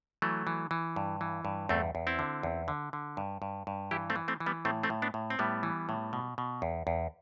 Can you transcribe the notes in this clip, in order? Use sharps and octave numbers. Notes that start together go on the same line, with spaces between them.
E3 F#3 A3
E3
E3
G2
E3
G2
E2 A3 C4
E2
C4 E4
D3
E2
D3
D3
G2
G2
G2
E3 E4 G4
A3 C4
E3
A3 C4
E3
G3 B3
A2 A3 C4
A3 C4
A2
B3 D4
A2
C4
A2 G3 B3
E3
A2
B2
B2
E2
E2